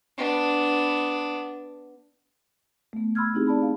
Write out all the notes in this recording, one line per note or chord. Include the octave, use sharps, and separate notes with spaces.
B3 D4
A3 B3
B5 C6 E6 F6 G#6
C4 D#4 E4 G4 G#4
D5 A5 B5
F5